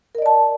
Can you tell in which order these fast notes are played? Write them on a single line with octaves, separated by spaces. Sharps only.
A#4 D#5 D5 A5